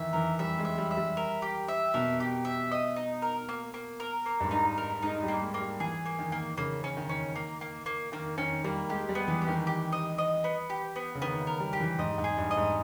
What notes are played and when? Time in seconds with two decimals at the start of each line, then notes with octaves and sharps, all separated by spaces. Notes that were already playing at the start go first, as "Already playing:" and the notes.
Already playing: D#3 E3 E5
0.13 E3 A#4
0.39 G3 E5
0.59 G#3
0.65 E5
0.78 G3
0.91 E5
0.97 G3
1.17 A#4
1.42 G4
1.68 E5
1.94 B2 A#4
2.20 G4
2.45 E5
2.71 D#5
2.96 D#4
3.22 A#4
3.49 A#3
3.74 A#3
4.00 A#4
4.26 A#3
4.40 G2
4.45 G#2
4.51 D#4
4.78 A#4
5.03 G#3 D#4
5.23 G3
5.28 A#3
5.42 G#3
5.54 A#3
5.61 G3
5.80 E3 G#4
6.06 A#3
6.19 D#3
6.32 A#3
6.57 C#3 A#3
6.84 C#4
6.97 D#3
7.09 C#4
7.36 A#3
7.61 A#3
7.86 A#3
8.12 D#3 A#3
8.38 D#3 C#4
8.64 G3 A#3
8.90 G#3 G4
9.09 G3
9.15 B3
9.28 E3
9.42 G4
9.48 D#3
9.67 G4
9.92 D#5
10.18 D#5
10.44 B3
10.70 G4
10.96 B3
11.15 C#3
11.21 D#3 B3
11.41 D#3
11.47 A#4
11.60 G3
11.73 G4
11.80 E3
11.98 G#2 D#5
12.18 G#2
12.24 G#4
12.38 G2
12.51 D#5
12.57 G#2